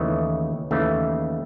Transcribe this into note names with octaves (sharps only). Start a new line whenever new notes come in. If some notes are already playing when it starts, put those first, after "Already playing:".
Already playing: D#2 C#3 E3 A3 C#5 D#5
D#2 C#3 E3 A3